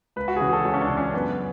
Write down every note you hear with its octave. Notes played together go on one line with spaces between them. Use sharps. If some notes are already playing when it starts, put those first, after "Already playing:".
C#2 B4
F#4
G#4
C#3 E3 F#4
A4
C#2 C#5
C#4
D4
C#3 E3
C#4
F#2 B3